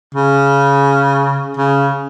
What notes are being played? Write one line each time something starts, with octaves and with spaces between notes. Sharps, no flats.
C#3
C#3